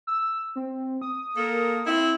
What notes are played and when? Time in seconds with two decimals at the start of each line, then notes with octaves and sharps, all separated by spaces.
0.07 E6
0.56 C4
1.02 D#6
1.37 A#3 A4 A#4
1.86 C4 E4